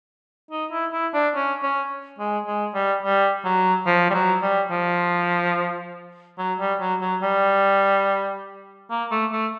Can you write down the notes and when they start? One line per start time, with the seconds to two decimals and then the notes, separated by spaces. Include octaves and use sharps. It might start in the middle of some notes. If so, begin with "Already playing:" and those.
0.51 D#4
0.71 E4
0.92 E4
1.14 D4
1.35 C#4
1.63 C#4
2.19 G#3
2.46 G#3
2.74 G3
3.03 G3
3.45 F#3
3.86 F3
4.10 G3
4.14 F#3
4.42 G3
4.71 F3
6.38 F#3
6.59 G3
6.80 F#3
7.01 F#3
7.22 G3
8.90 A#3
9.11 A3
9.32 A3